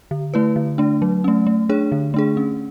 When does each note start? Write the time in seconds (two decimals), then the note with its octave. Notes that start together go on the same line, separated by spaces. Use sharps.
0.11 D3
0.34 A3 E4 B4
0.56 D3
0.78 A3 D4
1.02 F#3
1.24 A3 C#4
1.47 A3
1.69 D4 G#4 C#5
1.92 D3
2.14 A3 D4 G#4
2.37 C#4